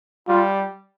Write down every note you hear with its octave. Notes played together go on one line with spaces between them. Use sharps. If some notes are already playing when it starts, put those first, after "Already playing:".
G3 F4